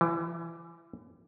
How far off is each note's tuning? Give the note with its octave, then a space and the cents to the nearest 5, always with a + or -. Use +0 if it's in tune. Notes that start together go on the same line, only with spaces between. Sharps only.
E3 +30